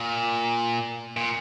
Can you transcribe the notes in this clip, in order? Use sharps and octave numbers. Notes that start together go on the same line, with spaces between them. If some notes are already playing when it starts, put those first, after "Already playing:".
Already playing: A#2
A#2